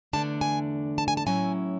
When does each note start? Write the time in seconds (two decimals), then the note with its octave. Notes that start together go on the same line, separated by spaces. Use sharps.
0.13 E2 D3 A3 D4 A5
0.41 G#5
0.98 A5
1.08 G#5
1.17 A5
1.26 A2 F#3 C#4 E4 G#5